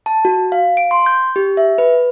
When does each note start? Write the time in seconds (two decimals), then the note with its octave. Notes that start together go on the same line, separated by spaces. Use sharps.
0.06 A5
0.25 F#4
0.52 F5
0.77 D7
0.91 C6
1.06 G6
1.36 G4
1.57 E5
1.78 B4